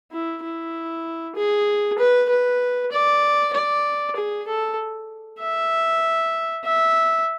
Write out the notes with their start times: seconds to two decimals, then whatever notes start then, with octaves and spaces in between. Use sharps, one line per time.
0.12 E4
0.43 E4
1.36 G#4
1.99 B4
2.29 B4
2.92 D5
3.54 D5
4.16 G#4
4.47 A4
5.40 E5
6.65 E5